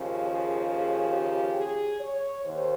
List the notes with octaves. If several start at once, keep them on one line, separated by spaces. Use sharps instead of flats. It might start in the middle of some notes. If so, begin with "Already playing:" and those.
Already playing: D#2 C#3 F3
G#4
G#4
G4
G#4
C#5
D#2 D#3 C5